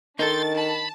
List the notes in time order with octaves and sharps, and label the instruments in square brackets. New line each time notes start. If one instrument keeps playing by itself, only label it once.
[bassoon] D#3 [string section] D4 A6 [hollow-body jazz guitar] D#4 A4 [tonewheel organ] C6 G6
[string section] A5 [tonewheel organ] B5